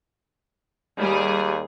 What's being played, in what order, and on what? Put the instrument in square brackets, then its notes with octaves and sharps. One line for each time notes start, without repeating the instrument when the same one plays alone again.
[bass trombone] D#2 [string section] G3 G#4